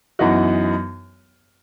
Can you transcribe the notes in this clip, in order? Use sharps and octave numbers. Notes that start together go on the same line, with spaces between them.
F#2 E3 B3 D#4 F#4